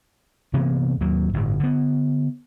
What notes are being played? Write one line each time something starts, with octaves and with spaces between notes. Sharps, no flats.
C3 E3 A#3 B3
D#2 F#3 A#3
G1 A2
D3 B3